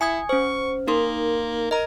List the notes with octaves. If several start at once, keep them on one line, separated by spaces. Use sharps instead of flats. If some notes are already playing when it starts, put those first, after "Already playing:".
E4 G#5 D#6 G#6
C#4 C5 C#6
A#3 D#4 A#4 C6
A#4 D#5 A#5